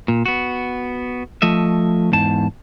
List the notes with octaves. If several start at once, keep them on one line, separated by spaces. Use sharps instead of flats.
A#2
B3 F#4
F3 A3 D#5 E5
E2 G#2 A5